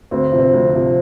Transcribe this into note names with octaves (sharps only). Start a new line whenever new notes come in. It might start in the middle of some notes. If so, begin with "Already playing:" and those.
D2 C4
C3 F3
C4
D2
C3 F3